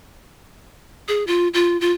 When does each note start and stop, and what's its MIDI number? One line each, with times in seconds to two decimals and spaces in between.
1.08 1.26 68
1.27 1.48 65
1.54 1.79 65
1.81 1.92 65